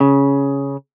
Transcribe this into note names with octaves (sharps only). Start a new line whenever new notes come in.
C#3